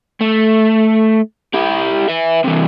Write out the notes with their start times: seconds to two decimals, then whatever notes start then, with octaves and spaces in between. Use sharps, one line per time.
0.21 A3
1.54 E4 G4
2.09 B4 E5
2.44 C3 E3